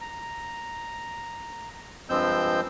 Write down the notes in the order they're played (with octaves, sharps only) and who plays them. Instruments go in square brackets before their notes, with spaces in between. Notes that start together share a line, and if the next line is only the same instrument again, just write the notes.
[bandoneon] A#5
G2 F3 G#3 C4 E6 G6